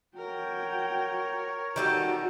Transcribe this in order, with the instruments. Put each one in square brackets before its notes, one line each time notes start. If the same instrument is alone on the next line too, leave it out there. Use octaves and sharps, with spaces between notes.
[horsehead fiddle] F#4 G5 [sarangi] A#4 [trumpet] C#5
[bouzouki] D#3 G3 A4 [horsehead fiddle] F#4 G4